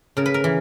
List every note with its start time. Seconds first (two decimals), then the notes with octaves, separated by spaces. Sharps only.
0.17 C#3 A#4
0.26 B4
0.34 A#4
0.44 E3